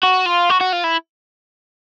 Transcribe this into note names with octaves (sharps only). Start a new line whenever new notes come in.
F#4
F4
F#4
F#4
F4
E4